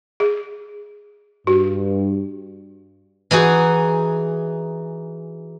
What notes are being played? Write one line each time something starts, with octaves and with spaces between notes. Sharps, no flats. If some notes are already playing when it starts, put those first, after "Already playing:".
G#4
G2 F#4
E3 D#4 F#4 G#4